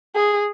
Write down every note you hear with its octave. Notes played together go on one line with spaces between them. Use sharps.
G#4